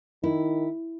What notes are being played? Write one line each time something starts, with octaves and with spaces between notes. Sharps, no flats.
D#3 E4